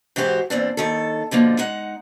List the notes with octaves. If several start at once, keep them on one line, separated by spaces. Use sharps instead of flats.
G#2 E3 F#4 G4 C5
E2 A#2 C4 D4
D#2 D#3 A4
B2 D3 F3 A#3
G#3 D#4 F#5